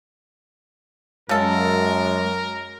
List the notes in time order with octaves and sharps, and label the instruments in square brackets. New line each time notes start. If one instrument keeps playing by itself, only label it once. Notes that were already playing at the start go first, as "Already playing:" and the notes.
[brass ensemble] F#2 [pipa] C#3 A4 [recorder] G#3 [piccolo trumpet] A#4